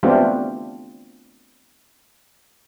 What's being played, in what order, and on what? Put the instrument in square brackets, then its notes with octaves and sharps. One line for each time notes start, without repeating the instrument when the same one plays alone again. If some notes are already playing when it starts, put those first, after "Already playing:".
[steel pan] A3 B3 C4 D4 F4 G4